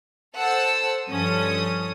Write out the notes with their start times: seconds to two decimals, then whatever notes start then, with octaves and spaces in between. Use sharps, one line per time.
0.37 A4 C5 F#5 A5 E6
1.07 G2 F3 C#4 A4 D#6